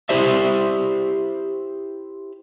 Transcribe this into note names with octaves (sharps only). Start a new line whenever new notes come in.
E4 G4 C5 D5 E5